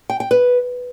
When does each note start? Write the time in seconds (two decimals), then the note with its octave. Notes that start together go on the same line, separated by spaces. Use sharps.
0.10 G5
0.20 G5
0.31 B4